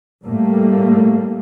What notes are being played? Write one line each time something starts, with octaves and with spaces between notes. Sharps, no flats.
A2 G3 A3 A#3